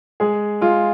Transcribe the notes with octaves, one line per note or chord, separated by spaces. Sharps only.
G#3 G#4
G#3 F4